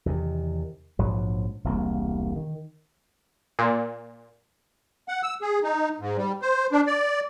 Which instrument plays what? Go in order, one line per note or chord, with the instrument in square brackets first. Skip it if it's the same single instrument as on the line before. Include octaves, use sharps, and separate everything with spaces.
[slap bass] E2 C3 D#3
A#1 G#2 F3 F#3
E1 C2 A#3
D#3
[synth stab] A#2
[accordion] F#5
E6
G#4
D#4
G#2
G3
C5
D4
D5